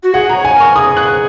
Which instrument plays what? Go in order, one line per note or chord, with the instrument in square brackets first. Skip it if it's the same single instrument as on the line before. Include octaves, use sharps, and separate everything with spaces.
[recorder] F#4
[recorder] G#4 [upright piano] F#5
[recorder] C#5 [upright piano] A#5
[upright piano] G#5
[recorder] A#4
[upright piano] C#6
[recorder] G#4 [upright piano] D#6
[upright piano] F#6